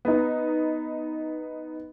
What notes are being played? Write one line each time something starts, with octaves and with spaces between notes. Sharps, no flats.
B3 D#4